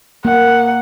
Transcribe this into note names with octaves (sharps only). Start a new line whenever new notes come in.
A#3 F#5